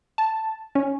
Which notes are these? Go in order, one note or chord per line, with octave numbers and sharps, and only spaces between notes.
A5
C#4